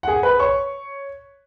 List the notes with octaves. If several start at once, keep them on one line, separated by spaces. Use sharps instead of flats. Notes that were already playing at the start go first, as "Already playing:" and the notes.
F#5
G#4 G#5
B4 B5
C#5 C#6